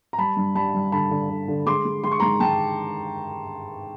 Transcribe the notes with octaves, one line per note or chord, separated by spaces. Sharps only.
A#5
G3 A5 B5
G2
G3 A5 B5
G3
D3 A5 B5
D3
D3
D3
G#3 C6 D6
G#3
G#3 C6
C#6
G#2 A#5 C6
G#2 G5 A5